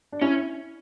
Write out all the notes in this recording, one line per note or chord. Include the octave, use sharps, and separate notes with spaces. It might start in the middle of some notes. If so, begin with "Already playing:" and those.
D4
C#4 E4